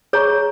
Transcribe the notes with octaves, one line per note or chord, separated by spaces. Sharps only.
G#4 C#5 A#5 C#6